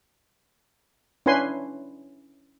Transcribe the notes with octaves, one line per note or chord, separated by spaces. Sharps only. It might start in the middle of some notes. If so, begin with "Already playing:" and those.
C#4 D4 E4 B4 G#5 C6